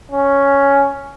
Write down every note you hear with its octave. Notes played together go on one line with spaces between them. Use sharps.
C#4